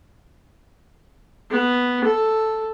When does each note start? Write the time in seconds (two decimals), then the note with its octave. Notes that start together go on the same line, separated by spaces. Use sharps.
1.51 B3
2.05 A4